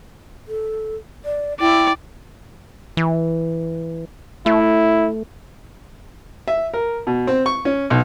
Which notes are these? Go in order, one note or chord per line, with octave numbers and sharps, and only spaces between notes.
A4
D5
E4 D5 G5
E3
A3 E4
E5
A#4
B2
C4
C#6
C#4
B1